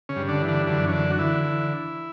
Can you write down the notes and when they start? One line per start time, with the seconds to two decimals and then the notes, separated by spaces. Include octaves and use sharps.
0.09 C#3 C#4
0.16 G2
0.28 D3 D4
0.42 E3
0.48 D3 D4
0.67 F#2 D3 D4
0.87 C#4
0.93 D3 D4
1.10 F#4
1.19 D3 E3 E4
1.44 E3